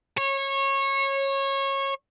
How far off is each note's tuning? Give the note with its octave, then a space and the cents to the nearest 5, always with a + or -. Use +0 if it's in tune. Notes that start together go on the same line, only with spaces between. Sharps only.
C#5 -20